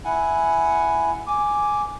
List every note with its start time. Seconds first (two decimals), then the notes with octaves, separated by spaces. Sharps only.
0.05 E4 F#5 G#5
1.27 G#5 D6